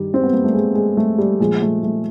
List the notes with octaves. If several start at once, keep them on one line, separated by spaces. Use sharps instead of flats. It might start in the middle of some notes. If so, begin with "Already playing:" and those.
Already playing: G2 D#3 G3
C4
B3
A#3
A3
G#3
G#3
A3
G3
A#2 F3 G#3
A3
A3